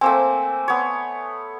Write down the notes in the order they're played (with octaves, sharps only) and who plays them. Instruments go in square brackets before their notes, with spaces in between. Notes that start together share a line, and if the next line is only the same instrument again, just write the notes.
[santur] A3 A#3 C4 [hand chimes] G#5
[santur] B3 C#5